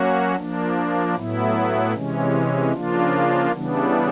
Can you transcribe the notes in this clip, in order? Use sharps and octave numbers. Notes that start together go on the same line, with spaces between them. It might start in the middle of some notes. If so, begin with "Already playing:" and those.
Already playing: F#3 A#3 C#4 F#4
F3 A#3 D4
A2 F#3 B3 E4
C3 E3 G#3 C#4
C#3 F3 A#3 D4 F4
C#3 E3 G3 B3 D4